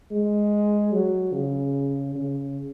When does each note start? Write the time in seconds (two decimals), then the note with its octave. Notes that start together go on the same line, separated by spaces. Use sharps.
0.11 G#3
0.92 F#3
1.33 C#3
2.15 C#3